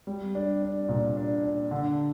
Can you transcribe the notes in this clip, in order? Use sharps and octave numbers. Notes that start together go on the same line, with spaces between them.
G3
D4
D4
A#2
D4
D4
D3